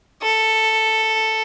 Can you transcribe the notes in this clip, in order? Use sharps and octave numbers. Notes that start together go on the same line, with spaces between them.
A4